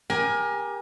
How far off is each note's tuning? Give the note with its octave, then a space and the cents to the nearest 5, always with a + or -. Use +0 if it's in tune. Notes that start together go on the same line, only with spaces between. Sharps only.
G4 +20 A#4 +25 G#5 +0